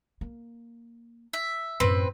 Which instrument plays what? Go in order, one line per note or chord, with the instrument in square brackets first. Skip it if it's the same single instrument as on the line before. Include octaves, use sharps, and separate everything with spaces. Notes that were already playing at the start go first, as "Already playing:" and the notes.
[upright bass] A#3
[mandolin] E5
[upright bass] F#2 A2 [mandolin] C4 B4